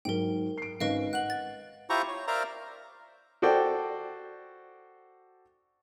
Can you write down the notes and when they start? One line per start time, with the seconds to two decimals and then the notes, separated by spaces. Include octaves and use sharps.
0.05 G#2 F#3 A#4 G5
0.58 C7 D7
0.80 G#1 C#4 B4 D#5 F5 D7
1.13 F#5 F#6 F#7
1.30 A6
1.90 E4 F4 G4 C5 A#5 C#6
2.08 C#5
2.27 A#4 C5 D5 E5 F5 A#5
3.42 F#4 A4 C5 D5 G5